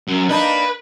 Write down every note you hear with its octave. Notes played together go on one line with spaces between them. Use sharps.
F#2
A#3 D4 D#4 B4